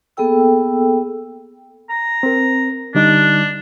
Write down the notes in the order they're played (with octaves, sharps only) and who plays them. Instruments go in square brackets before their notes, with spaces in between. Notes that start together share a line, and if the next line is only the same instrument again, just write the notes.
[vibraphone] A#3 B3 G#4 A4 G5 E6
[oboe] A#5
[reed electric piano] C4 A#4
[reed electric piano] D3 G3 D#4 [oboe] D4